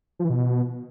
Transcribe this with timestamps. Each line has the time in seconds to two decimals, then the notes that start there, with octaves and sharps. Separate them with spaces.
0.19 F3
0.25 E3
0.30 B2